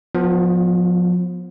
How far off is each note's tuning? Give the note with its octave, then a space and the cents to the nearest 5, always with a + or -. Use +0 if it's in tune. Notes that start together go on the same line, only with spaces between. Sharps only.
F3 +35 B3 +0 F4 -20